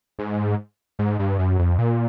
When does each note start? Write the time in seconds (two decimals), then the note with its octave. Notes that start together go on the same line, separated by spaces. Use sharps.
0.19 G#2
0.99 G#2
1.19 G2
1.39 F#2
1.59 F2
1.78 A#2